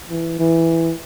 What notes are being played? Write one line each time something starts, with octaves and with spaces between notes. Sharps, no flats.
E3
E3